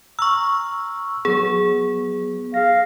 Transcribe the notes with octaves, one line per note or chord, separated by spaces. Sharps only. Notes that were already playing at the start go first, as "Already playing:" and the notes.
A#5 C#6 E6 F6
F#3 B3 G#4
G#4 F5 A#6